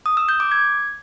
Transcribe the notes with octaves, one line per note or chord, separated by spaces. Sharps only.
D#6
E6
G6
D6
G#6